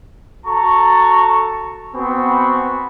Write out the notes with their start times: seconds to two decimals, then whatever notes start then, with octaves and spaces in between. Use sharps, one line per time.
0.46 F#4 A4 A5 A#5 C#6
1.95 B3 C4 F#4 G#5 B5 C#6